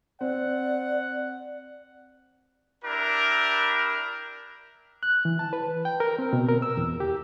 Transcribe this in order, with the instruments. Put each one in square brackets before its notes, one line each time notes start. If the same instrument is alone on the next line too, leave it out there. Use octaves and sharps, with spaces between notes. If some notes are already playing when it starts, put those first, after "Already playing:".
[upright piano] C4 [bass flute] D5 [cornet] F#5
[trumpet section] D4 E4 G4 A#4
[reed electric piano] F#6
E3
A5
B4
G5
A#4
C4
B2
A#4
E6
E2
G4